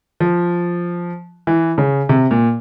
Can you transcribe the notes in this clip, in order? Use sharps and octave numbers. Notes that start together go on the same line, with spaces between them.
F3
E3
C#3
C3
A#2